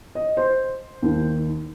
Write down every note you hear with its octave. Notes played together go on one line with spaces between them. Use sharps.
D#5
C5
D#2 D#3